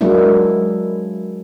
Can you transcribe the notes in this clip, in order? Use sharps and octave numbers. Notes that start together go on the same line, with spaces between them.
F#3 G#3 A#3 D4 E4